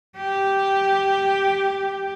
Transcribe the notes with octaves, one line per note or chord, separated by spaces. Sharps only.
G4